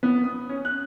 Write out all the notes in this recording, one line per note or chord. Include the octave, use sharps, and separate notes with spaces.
B3
D#6
C#4
F#6